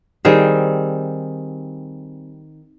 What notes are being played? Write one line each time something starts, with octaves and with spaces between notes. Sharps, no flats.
D#3 G3 C4 G#4